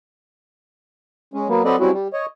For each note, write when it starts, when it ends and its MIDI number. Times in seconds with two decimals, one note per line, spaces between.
1.34 1.48 56
1.34 1.48 61
1.48 1.62 54
1.48 1.62 58
1.48 1.62 59
1.65 1.76 54
1.65 1.76 60
1.65 1.76 69
1.65 1.76 71
1.65 1.76 74
1.65 1.76 75
1.80 1.91 54
1.80 1.91 55
1.80 1.91 60
1.80 1.91 61
1.80 1.91 64
1.80 1.91 66
1.93 2.08 55
2.13 2.26 73
2.13 2.26 75